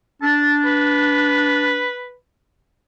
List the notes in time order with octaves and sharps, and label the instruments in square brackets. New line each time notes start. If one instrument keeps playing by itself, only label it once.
[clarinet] D4 [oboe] A5
[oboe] B4